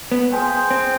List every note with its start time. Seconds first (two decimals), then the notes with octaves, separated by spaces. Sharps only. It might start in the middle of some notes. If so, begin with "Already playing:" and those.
0.12 B3
0.31 F4 G#4 C5 G5
0.71 C4